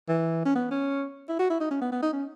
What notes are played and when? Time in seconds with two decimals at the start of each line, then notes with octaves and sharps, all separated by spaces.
0.08 E3
0.45 C#4
0.55 B3
0.71 C#4
1.29 E4
1.39 F#4
1.50 E4
1.60 D#4
1.71 C#4
1.81 B3
1.92 B3
2.02 D#4
2.13 C#4